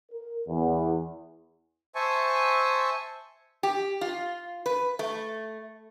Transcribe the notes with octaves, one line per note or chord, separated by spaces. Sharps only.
A#4
E2
C5 E5 G#5 A5 C#6
G4
F4
B4
A3